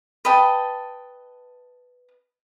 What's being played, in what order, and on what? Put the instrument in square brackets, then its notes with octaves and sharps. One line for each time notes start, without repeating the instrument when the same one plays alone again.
[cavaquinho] B4 D#5 G5 A5